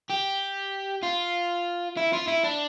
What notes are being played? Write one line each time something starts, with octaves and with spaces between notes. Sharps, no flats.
G4
F4
E4
F4
E4
D4